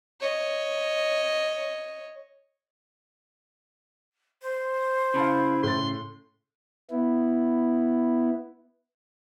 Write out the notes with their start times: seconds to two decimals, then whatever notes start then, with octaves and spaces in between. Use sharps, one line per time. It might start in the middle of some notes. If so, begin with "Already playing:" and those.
0.21 C#5 D#5
4.42 C5
5.14 C#3 E4 F5 A5 B5
5.63 A2 C6 A6
6.90 B3 E4